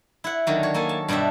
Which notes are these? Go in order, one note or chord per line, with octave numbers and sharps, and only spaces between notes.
E4 F#5
D3 D#3 F#3
C#5
A#3 A4 G#5
A5
G2 B2 D4 G4 E5